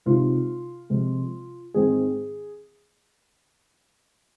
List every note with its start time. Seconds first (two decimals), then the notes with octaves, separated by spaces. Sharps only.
0.06 C3 G#3 D#4 F4
0.90 C3 F3 G#3
1.74 G#2 D#3 G#3 C4 G#4